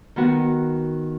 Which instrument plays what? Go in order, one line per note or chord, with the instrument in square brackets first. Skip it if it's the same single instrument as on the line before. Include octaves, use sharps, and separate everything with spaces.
[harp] D#3 B3 F#4